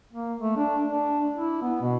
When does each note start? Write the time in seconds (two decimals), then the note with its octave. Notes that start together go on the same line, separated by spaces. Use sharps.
0.13 A#3
0.40 A3
0.57 D4
0.87 D4
1.37 E4
1.62 B3
1.82 B2